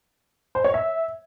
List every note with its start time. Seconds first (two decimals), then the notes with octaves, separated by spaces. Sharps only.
0.55 C5
0.64 C#5
0.74 E5